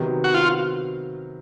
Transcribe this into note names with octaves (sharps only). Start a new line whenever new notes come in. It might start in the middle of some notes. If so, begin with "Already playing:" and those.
Already playing: C3 D#3 F#3 B3
F#4
F4